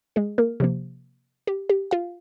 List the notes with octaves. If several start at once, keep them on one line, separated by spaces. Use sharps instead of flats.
G#3 G#4
A#3 A#4
C3 F3 A#3
G4
G4
F4 F5